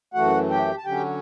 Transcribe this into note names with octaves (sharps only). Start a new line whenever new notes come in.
F#2 E3 A3 F#4 F#5
G4 G5
A5
D3 F#3 C#4 G4 G5